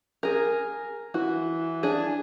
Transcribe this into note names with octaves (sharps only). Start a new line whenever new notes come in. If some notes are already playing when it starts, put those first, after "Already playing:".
G#4 A#4
E3 F#4
D4 G#4